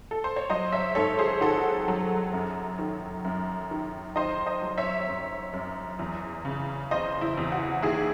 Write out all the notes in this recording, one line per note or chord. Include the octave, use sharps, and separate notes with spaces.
A4
C5
C#5
F#3 C5 D#5
C#5 E5
G#2 A4 C#5
G#4 C5
D#3 F#4 A4
F#3
F#2
D#3
F#2
D#3
D#3 C5 D#5
C5 D#5
F#3
C#5 E5
F#2
F#2
E2
C#3
E2 C5 D#5
E4
E2
F#4
D#2 E4 G#4